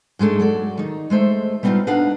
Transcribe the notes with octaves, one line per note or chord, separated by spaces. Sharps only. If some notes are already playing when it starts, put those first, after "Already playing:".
G#2 G#3 A3 D4
F#3 A4 D5
D#3 D#4
G#3 A3 C5 E5
G3 B3 C4 D4 D#4 F4
D4 D#4 B4 F5 F#5